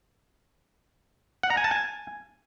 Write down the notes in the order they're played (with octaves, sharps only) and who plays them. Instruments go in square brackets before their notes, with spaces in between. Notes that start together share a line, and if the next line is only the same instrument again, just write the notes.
[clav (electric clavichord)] F#5
A#5
G#5
A5
G#5